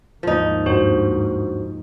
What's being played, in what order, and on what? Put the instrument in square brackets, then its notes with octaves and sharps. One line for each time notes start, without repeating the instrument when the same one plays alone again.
[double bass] D#2 G#2 [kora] F3 D#4
[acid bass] G2 [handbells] F#4 C5